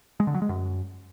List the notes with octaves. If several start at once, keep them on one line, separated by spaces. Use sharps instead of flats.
G#3
D3
F#3
G#3
F#2